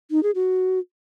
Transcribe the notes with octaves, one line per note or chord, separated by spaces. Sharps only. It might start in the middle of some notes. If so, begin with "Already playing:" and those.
D#4
G#4
F#4